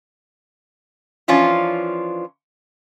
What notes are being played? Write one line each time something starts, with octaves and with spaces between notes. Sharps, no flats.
E3 F3 C#4 D4 F4